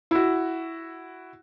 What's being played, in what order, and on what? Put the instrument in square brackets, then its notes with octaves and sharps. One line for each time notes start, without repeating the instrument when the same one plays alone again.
[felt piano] E4 F#4